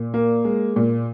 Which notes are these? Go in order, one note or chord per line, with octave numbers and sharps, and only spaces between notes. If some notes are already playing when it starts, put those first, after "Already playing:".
Already playing: A#2
A#3
G#3
A#2